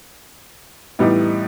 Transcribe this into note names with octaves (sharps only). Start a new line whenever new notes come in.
A2 E3 G3 B3 D#4